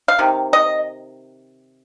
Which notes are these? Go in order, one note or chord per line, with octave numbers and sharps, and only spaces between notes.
F5
C3 D#3
D#5